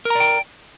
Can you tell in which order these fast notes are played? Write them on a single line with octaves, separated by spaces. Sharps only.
A#4 A#5 D5 G5